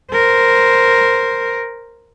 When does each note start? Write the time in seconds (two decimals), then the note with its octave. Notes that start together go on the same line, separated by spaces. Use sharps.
0.12 A#4 C5